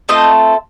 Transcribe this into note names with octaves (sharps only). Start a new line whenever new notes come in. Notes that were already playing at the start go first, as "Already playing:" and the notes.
A3 C4 F4 A4 D#5